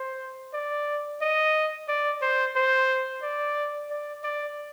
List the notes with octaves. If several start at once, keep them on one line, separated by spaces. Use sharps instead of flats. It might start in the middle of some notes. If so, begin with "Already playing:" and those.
Already playing: C5
D5
D#5
D5
C5
C5
D5
D5
D5